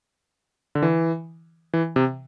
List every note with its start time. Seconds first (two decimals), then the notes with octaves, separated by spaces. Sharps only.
0.75 D3
0.82 E3
1.73 E3
1.96 C3